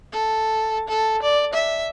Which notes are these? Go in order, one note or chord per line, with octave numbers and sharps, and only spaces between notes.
A4
A4
D5
E5